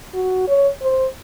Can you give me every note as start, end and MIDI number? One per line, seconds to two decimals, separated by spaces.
0.14 0.47 66
0.48 0.69 73
0.82 1.06 72